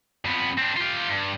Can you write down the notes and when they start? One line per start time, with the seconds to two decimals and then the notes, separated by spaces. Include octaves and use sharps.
0.25 F2 B3
0.58 C4 D4
0.77 F4 G4
1.10 G2